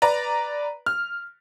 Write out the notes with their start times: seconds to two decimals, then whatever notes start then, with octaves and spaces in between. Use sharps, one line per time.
0.02 B4 D5 A#5
0.86 F6